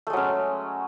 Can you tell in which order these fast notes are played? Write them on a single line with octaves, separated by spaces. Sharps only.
A3 G#3 F#3 C#4